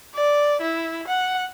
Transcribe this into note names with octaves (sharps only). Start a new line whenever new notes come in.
D5
E4
F#5